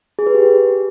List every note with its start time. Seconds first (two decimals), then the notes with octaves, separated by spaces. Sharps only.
0.19 G#4
0.27 B4
0.34 G4